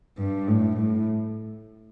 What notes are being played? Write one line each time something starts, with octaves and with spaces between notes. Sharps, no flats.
G2
A2
A2